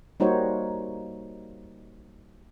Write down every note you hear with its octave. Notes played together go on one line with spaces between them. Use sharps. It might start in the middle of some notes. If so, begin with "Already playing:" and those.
G3 A#3 D#4 F#4 C5 C#5